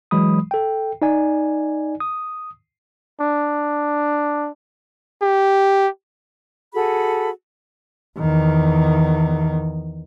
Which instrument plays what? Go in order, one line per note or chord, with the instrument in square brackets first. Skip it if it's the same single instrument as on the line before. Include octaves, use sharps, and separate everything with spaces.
[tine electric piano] E3 F#3 G#3 B5 D#6
A4 G5
D#4 D5 G#5
D#6
[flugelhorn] D4
G4
[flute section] F#4 G#4 A4 B5
[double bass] E2 D#3